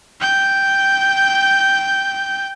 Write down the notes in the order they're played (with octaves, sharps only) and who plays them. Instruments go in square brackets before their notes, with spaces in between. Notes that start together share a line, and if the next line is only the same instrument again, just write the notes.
[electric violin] G5 G6